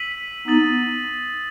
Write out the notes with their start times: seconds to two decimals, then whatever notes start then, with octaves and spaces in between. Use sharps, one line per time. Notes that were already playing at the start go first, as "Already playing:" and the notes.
Already playing: E6 B6 D#7 F#7
0.47 B3 D#4 D#6 A6 D#7 F#7